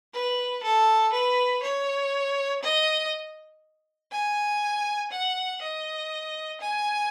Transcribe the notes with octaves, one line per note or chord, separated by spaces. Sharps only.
B4
A4
B4
C#5
D#5
G#5
F#5
D#5
G#5